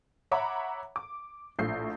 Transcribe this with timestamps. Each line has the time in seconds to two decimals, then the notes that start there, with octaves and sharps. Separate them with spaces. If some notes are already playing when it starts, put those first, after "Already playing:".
0.31 C#5 E5 F#5 A#5 B5 D6
0.96 D6
1.59 A#1 A2 G6 C7